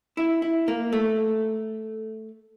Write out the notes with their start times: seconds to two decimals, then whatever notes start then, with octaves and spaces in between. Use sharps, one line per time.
0.17 E4
0.42 E4
0.68 A#3
0.93 A3